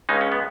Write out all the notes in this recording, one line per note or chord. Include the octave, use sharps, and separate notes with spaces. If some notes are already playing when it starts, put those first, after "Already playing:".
C#2 C#3 G#3 D#4
C#4
B3